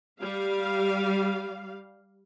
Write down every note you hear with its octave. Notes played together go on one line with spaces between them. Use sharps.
G3 F5